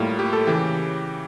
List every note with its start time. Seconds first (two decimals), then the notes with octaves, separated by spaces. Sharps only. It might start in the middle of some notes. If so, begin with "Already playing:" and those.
Already playing: A2 G3 A#3 F4
0.19 G4
0.33 A4
0.47 C#3 E3 G4